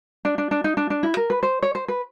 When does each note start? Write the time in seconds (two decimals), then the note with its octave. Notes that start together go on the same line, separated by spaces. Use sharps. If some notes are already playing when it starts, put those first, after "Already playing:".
0.25 D4
0.38 D4
0.51 D4
0.64 D#4
0.77 D4
0.90 D4
1.03 E4
1.17 A#4
1.30 B4
1.43 C5
1.62 C#5
1.75 C5
1.88 B4